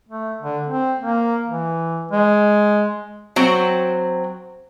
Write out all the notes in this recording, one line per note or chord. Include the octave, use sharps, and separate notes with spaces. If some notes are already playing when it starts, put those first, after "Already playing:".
A3
D3
C4
A#3
E3
G#3
F#3 C4